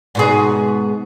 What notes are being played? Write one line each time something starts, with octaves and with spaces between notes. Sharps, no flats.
G#2 B2 G#4